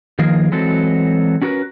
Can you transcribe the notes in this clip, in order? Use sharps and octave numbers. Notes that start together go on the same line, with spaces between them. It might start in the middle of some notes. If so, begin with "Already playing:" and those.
D#3 F3 A#3 G#4 A#4
E3 F#3 G#3 C4 F#4 A4
C#4 F#4 G#4 A#4 B4